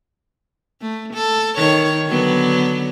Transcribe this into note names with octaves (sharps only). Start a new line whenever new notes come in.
A3
A4
D#3 C#5
D3 F#3 B3